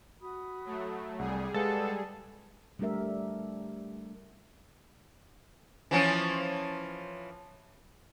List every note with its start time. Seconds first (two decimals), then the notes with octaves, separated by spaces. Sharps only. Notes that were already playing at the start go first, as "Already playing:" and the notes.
0.22 F#4 B5 D#6
0.65 F#3 A3
1.19 C2 G3 G#4 F#5
1.54 G#3 A4 B4 F5 F#5
2.79 G3 A3 D4 G4 A#4 E5
5.91 E3 F3 C#4